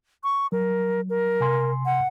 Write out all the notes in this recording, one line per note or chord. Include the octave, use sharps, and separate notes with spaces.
C#6
F#3 A#4
A#4
C3 G#5 C6
F#5